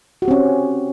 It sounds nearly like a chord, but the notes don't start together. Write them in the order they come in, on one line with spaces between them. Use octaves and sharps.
F#4 G4 C4 C#4